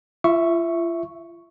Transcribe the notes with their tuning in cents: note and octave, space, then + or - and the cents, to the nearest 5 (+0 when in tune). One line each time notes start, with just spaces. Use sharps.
F4 -40 E5 +0 C#6 +0